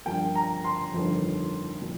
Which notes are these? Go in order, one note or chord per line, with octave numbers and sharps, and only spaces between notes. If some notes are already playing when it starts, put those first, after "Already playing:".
G2 F3 A#3 G5
A#5
C6
G1 F2 D#3 A#3
A#2 F3